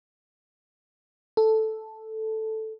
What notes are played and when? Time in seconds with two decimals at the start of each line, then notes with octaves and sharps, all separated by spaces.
1.37 A4